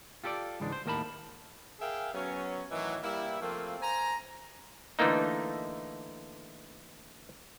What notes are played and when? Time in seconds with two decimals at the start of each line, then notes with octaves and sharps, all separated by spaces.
0.24 F4 G4 A4 B4 D5
0.60 C#2 G#2 E3 G#3 D4
0.72 C5
0.86 D#2 A2 A#4 A5 B5
1.80 G#4 A#4 E5 F5 G5
2.13 F#3 B3 C#4
2.70 A2 D#3 E3 F#3
3.02 G3 A#3 E4
3.40 F3 A3 A#3 C4 F4
3.80 C5 G#5 A#5
4.99 D3 E3 A3 A#3 D#4